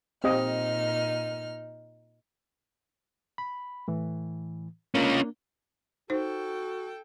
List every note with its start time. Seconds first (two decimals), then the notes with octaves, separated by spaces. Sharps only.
0.24 A#2 C4 D#4 G4 D#5 F6
3.38 B5
3.88 A2 E3
4.95 A#3 C#4 D4 F4
6.10 D#4 F#4 A4 C5 G5